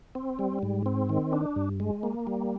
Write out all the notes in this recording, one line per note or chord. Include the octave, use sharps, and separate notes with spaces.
C4
G3
G#2
C4
D#3
D4
G2
G#3
A#3
G3